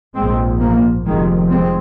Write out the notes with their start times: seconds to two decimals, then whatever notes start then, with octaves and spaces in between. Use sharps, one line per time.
0.15 A#1 G#2 G#3 C4
0.60 F3 A#3
1.05 F1 F2 C3 D#3 G#3
1.50 G#3 C4